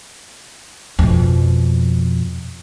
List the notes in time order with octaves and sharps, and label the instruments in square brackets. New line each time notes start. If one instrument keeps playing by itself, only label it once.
[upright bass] F2 B2